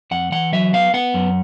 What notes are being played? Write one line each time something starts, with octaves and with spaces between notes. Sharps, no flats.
F2 F#5
E3 F#5
F#3 E5
B3 F5
B3 F#5
F#2